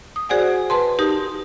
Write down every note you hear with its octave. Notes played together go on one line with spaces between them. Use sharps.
D#6
F#4 G#4 C5 D5 F#5 G#5
B4 A5 C6
D#4 G4 A#4 D#6